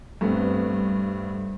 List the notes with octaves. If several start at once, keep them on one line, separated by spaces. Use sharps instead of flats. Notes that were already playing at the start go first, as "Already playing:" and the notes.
G2 A3 B3 C4